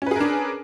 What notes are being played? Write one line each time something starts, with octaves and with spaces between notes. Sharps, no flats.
C#4 D4 G#4 A#4 B4